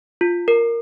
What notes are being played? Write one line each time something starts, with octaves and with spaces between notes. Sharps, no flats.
F4
A#4